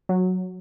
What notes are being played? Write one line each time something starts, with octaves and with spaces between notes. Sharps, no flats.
F#3